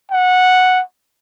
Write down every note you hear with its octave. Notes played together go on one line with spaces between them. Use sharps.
F#5